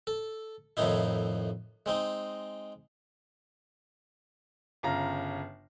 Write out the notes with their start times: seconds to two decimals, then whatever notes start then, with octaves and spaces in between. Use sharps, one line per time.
0.07 A4
0.77 F2 A2 C3 D#3 D#4 E4
1.86 G#3 C4 D#4
4.83 G1 C#3 F4 A#5